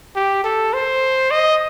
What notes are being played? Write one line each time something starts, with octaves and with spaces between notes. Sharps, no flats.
G4
A4
C5
D#5